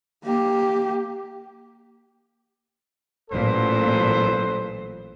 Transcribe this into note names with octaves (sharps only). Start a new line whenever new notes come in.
A#3 G4
A1 A#2 F#3 A4 B4 C5